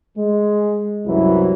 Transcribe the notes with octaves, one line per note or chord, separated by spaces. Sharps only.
G#3
C2 F#2 E3 F#3 E4